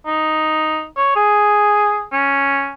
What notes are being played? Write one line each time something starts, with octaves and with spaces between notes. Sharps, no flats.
D#4
C#5
G#4
C#4